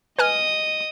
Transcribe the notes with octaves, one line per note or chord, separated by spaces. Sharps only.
B4 D#5 G#5 D#6 F6